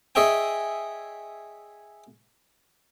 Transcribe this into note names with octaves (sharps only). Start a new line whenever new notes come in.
G#4 C#5 D#5 E5 G5 G#5